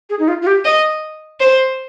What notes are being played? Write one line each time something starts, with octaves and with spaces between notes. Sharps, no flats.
G#4
D#4
F4
F4
G4
D#5
C5